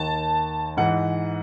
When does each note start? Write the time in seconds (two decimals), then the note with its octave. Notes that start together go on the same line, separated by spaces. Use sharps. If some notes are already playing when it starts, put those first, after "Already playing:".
Already playing: D#2 D#3 A5
0.77 G#2 E3 F#5